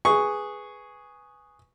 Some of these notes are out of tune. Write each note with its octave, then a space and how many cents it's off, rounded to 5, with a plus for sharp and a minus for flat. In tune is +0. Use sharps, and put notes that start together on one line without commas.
G#4 +0 B4 +0 C#6 +0